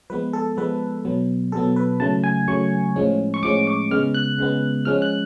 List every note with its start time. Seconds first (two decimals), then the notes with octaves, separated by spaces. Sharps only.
0.10 F3 G#3 B3 B4
0.33 A4
0.57 F3 G#3 B3 B4
1.05 B2 F#3 B3
1.52 B2 F#3 B3 A4
1.76 B4
2.00 C#3 F#3 A3 A5
2.24 G#5
2.48 C#3 F#3 A3 C#6
2.96 A2 F3 G#3 C#4
3.34 C#6
3.43 A2 F3 G#3 C#4 D6
3.67 D6
3.91 C#3 G#3 B3 F6
4.14 F#6
4.38 C#3 G#3 B3
4.85 F3 G#3 C#4 F6
5.02 F#6